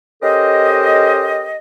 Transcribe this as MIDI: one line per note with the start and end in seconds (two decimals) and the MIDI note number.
0.22 1.56 61
0.22 1.56 67
0.22 1.56 69
0.22 1.56 70
0.22 1.56 72
0.22 1.56 75